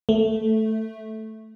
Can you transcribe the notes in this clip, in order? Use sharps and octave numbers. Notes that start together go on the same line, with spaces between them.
A3